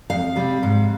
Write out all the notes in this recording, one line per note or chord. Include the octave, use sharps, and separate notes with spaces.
F2 F5
C3 G3
G#2